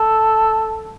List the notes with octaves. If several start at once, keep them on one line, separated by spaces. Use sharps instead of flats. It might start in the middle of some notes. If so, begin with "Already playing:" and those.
Already playing: A4